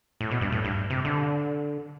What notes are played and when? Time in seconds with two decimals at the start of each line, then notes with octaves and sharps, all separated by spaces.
0.21 A2
0.31 B2
0.41 G2
0.52 A2
0.65 G2
0.90 C3
1.05 D3